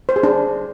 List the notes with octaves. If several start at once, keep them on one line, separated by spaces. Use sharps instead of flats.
C5
G#4
D4